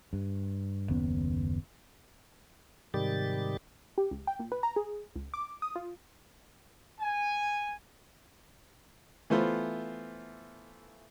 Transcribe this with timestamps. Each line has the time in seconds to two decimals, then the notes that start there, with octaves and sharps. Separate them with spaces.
0.13 G2
0.89 F#1 D#2 B3 C#4
2.94 G#2 C3 D#3 G3 G4 A6
3.98 G4
4.11 C#2
4.27 G5
4.39 A#2
4.52 B4
4.63 A#5
4.76 G#4
5.16 C#2
5.34 D6
5.62 D#6
5.76 F4
7.00 G#5
9.30 E3 A3 B3 F4 C5